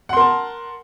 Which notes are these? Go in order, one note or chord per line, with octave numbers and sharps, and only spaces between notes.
A#4 F#5 A5 C6